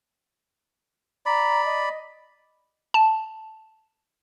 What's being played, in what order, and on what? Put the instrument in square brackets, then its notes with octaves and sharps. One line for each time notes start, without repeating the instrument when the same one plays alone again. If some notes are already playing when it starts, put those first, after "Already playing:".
[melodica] D5 B5 [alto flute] A#5
[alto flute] D#5
[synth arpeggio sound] A5